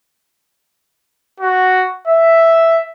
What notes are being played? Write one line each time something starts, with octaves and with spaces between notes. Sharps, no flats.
F#4
E5